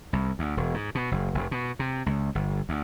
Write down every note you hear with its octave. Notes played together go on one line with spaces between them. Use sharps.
C2
D2
E1
G#2
B2
F#1
F1
B2
C3
C#2
G1
D2